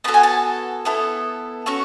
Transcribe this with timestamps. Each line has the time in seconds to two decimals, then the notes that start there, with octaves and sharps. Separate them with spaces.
0.04 B3 D#4 A5
0.08 F#4 A4
0.14 G#5
0.23 A5
0.85 B3 E4 A4
1.66 C#4 F#4 A4 C#6